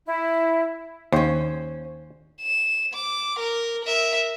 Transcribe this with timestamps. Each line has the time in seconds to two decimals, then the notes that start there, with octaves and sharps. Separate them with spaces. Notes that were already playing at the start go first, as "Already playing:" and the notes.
0.06 E4
1.12 D#2 C#4 C5
2.42 E7
2.94 D6
3.40 A#4
3.85 A#4 E5